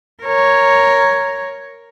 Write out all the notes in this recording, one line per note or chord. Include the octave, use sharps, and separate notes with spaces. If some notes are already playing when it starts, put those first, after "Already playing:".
A#4 C#5